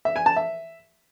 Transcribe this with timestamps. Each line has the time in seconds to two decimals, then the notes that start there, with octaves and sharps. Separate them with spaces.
0.05 E5
0.16 G#5
0.26 A5
0.36 E5